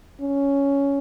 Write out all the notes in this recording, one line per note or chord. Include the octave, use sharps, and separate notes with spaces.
C#4